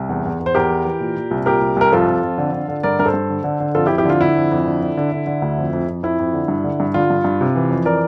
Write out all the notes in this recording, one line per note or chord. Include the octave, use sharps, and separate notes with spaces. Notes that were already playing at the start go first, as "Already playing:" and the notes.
Already playing: C2
E2
E2
E2
C5
E2 G4 A#4
E3
E3
A#2
A#2
C2
A#2 G4 A#4
C2
C2 A#4
F2 F4 A4
F2
F2
D3
D3
D3
G2 A#4 D5
G2 A#4
A4 C5
G2
D3
D3
D3
F2 F4 A4
E4 G4
F2
E4 G4
D3 F4
D3 E4
F2
F2
D3
D3
D3
D3
D3
D2
F2
F2
F2
F2 E4
F2
D3
G2
D3
G2
D3 F4
G2
G2
C3
E3
F2
E3 A#4 D5